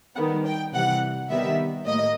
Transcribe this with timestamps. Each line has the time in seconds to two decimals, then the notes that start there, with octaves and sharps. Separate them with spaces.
0.16 D#3 G3 B3 F#5
0.46 G5
0.74 C3 E3 G3 F#5
1.30 D#3 G3 B3 E5
1.86 A2 A#3 D#5